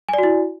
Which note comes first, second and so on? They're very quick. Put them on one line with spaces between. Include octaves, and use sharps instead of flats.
G#5 D5 F#4 E4